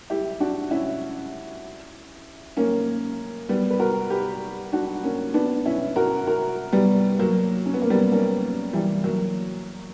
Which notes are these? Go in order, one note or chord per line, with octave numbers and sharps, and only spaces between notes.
E4 G4
D4 F#4
C#4 E4
A#3 C#4
G3 B3
B4
F#4 A#4
G4 B4
D4 F#4
A#3 C#4
B3 D4
C#4 E4
F#4 A#4
F#4 A#4
G3 B3
F#3 A#3
C#4
B3
A#3
G3 B3
A#3 C#4
E3 G3
F#3 A#3